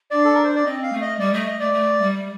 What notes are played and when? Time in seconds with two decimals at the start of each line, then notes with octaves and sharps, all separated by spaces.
0.11 D4 D5
0.25 A4
0.34 A#4
0.44 C5
0.55 D5
0.65 C4 D#5
0.83 F5
0.92 A3
1.01 D#5
1.19 G3 D5
1.33 A3 D#5
1.47 D#5
1.60 A3 D5
1.73 A3
2.01 G3